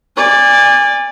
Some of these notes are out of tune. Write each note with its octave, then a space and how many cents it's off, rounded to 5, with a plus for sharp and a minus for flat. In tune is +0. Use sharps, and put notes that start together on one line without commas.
D5 +0 G#5 -30